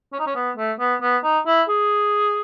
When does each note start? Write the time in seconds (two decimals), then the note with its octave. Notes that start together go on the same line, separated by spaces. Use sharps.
0.13 C#4
0.19 D#4
0.27 C#4
0.35 B3
0.57 A3
0.79 B3
1.01 B3
1.24 D#4
1.47 E4
1.69 G#4